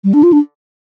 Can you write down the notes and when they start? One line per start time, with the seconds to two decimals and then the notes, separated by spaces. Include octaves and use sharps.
0.04 G3
0.14 D4
0.23 F4
0.33 D4